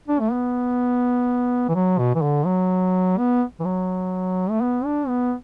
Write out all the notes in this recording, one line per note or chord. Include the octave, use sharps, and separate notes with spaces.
D4
A3
B3
E3
F#3
B2
E3
D3
F#3
B3
E3
F#3
A3
B3
D4
B3